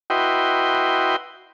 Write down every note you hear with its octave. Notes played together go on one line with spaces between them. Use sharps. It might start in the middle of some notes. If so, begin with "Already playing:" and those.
E4 F#4 B4 D#5 G5 C6